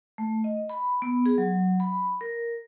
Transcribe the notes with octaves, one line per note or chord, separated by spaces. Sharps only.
A3
D#5
B5
B3
G#4
F#3
B5
A#4